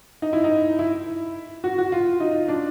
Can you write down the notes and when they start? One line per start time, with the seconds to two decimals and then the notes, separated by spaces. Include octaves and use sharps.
0.22 D#4
0.33 E4
0.44 D#4
0.79 E4
1.64 F#4
1.78 F#4
1.92 F4
2.20 D#4
2.48 D4